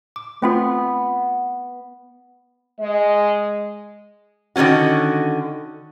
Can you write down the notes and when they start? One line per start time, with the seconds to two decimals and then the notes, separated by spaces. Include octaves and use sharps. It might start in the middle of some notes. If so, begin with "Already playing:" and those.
0.16 D6
0.42 A3 B3 C4 F4
2.80 G#3 D#5
4.56 D3 D#3 A3 C#4 F#4